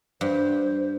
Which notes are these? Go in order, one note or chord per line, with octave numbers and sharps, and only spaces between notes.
G2 C5